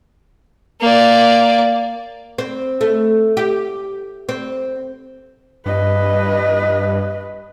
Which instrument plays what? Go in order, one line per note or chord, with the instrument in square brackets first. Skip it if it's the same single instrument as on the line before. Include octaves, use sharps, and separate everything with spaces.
[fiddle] A#3 D5
[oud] C4
A3
G4
C4
[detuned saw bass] G2 [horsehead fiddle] B4 D#5